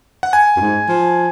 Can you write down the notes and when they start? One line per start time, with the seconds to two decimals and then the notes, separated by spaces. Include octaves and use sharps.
0.23 F#5
0.33 G#5
0.56 F#2
0.61 G#2
0.88 F3